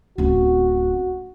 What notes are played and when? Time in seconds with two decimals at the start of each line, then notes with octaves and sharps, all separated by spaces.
0.18 D1 C#4 F#4